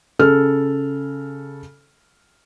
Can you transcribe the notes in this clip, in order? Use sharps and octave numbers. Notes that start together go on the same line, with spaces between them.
C#3 A4 F6